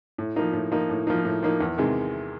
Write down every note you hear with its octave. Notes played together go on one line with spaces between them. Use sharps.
A2
F3 A#3 D#4
A2
F3 A#3 D#4
A2
F3 A#3 D#4
A2
F3 A#3 D#4
E2
C3 D#3 G#3